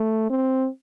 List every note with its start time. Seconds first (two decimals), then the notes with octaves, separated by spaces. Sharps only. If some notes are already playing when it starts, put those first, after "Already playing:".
Already playing: A3
0.30 C4